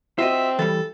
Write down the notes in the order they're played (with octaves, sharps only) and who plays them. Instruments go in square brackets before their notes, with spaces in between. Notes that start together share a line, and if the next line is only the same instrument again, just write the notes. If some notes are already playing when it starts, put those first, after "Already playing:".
[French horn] C4 [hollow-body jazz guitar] F4 F#4 D#5 [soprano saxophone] E5
[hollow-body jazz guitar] E3 G3 [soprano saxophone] A4